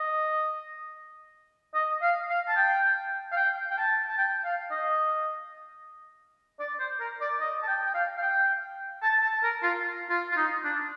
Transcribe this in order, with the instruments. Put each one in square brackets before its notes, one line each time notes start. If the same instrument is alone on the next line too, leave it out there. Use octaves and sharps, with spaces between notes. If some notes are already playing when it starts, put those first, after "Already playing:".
Already playing: [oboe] D#5
D#5
F5
F5
A5
G5
F5
G5
G5
A5
A5
G5
F5
D#5
D5
C5
A#4
D5
D#5
A5
G5
G5
F5
F5
G5
A5
A5
A#4
F4
F4
F4
D#4
D4